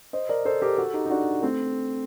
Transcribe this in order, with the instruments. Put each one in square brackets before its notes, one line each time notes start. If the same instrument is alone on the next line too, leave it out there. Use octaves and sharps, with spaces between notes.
[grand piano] C5 D#5
A#4 D5
A4 C5
G4 A#4
F#4 A4
D#4 G4
D#4
D4 F#4
A3 C4